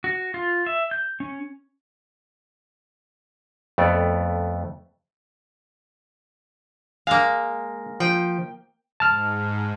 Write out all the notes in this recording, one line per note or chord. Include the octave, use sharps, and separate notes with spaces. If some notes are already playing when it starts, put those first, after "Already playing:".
F#4
F4
E5
G6
C#4
F2 A3 B3 D5
G#3 A#3 F5
F3 G5
G#2 A5 F6